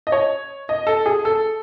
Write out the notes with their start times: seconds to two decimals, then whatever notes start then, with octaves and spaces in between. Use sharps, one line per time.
0.07 D#5
0.12 C#5
0.69 D#5
0.87 A4
1.06 G#4
1.25 A4